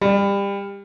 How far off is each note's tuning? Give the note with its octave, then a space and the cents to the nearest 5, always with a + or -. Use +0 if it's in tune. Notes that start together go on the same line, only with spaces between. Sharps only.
G3 +25